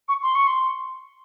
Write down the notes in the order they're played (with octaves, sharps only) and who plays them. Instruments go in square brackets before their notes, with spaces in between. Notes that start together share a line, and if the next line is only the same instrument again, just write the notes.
[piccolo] C#6
C6
C#6
C6